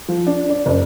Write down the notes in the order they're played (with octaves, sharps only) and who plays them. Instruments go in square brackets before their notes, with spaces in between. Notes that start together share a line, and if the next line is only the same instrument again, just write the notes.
[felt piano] F3
D4
D5
F#1